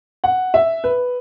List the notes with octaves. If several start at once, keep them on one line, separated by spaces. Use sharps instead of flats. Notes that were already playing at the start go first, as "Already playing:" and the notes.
F#5
E5
B4